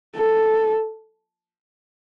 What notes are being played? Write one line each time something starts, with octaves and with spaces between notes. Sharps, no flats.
A4